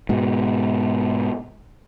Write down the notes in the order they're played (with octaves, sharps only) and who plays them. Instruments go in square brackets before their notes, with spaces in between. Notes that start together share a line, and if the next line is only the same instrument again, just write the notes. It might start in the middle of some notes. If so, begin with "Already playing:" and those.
[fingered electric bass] G#2 B2